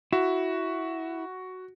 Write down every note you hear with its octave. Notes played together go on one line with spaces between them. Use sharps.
E4 F#4